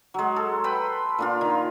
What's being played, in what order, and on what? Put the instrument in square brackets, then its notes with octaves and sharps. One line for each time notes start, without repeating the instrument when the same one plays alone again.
[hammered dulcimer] F#3 G#3
A4
B4 G5 B5 C6
A#2 D4 F4
D#3